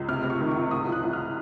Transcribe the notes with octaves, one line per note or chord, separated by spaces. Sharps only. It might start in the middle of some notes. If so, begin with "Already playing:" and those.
Already playing: C#2
C3 F6
C3
C#6
D#3
C#6
C#2
C2 D#6
F3 F#6
C2
F6